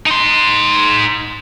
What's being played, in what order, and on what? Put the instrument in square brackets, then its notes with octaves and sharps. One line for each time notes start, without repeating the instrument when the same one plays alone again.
[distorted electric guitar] D#4 C6